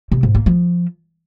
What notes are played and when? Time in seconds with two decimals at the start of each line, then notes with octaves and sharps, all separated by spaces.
0.12 C3
0.23 G#2
0.35 A#3
0.46 F3